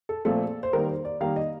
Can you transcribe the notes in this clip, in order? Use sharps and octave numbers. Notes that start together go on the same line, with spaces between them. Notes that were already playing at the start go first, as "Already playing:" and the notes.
A4
A#2 F3 A3 C4 A4
C5
D#3 G3 A#3 A#4
C5
D5
D#3 G3 A#3 F5
D#5